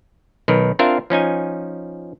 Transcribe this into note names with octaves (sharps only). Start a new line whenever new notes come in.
B1 D#3 A#4 B4
C4 D4 F4 A#4 E5 F5
F3 C#4 D#4 G#5